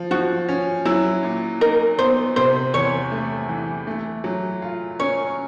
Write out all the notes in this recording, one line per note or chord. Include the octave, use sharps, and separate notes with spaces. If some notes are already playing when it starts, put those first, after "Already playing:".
Already playing: F3
F3 F#4
C#4
F#3 E4
A#2
D#4 A#4
B3 C5
C3 C5
E2 C#5
A3
E3
A3
F#3
F4
C#4 C#5